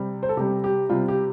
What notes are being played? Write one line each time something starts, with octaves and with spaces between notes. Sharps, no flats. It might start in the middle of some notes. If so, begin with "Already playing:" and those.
Already playing: C3 G3
C5
A4
C3 G3 G4
G4
C3 G3 F4
G4